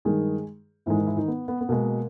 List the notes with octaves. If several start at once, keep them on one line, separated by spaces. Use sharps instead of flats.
G2 D#3 G#3 G#4
G#2 D#3 E3 G#3 E4
D#3 D#4
E3 E4
D#3 D#4
B3
B3
B3
B2 G#3 A#3